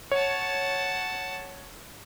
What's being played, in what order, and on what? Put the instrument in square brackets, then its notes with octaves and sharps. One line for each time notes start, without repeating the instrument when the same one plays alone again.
[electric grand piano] C#5 [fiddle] F#5 A5